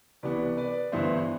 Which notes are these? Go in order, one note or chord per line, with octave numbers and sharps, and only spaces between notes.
C2 C3 E3 B3 B4 D5
B4 D5
G1 G2 E3 B3 C5 E5